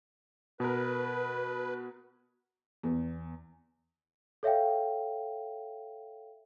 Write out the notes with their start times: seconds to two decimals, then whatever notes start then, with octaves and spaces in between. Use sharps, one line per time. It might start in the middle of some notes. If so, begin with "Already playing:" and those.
0.60 B2 A#4 B4
2.83 E2
4.43 A4 C#5 E5 F5 G5